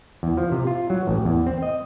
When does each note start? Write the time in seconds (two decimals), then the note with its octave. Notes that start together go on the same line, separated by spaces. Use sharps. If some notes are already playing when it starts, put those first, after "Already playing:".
0.23 E2
0.37 F3
0.52 C3
0.67 F4
0.90 F#3
1.07 A1
1.25 E2
1.46 C4
1.63 D#5